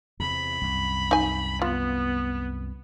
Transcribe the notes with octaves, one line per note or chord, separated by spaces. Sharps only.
E2 C3 B5
C2 F#2
D#4 G#5
B3 F4